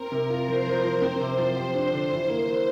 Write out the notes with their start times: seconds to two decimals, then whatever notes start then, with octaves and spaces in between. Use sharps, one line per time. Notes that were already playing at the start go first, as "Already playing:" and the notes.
Already playing: C4 A#4
0.12 C3
0.30 F4
0.48 F3 C5
0.66 F3
0.84 F3
1.02 C4
1.20 C3
1.38 F3
1.56 G4 C5
1.74 D4
1.92 D3
2.10 E3
2.29 A#3
2.47 E3